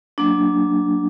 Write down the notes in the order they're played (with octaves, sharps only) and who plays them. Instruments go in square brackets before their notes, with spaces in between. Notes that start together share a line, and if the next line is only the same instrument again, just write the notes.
[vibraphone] F#3 A#3 D4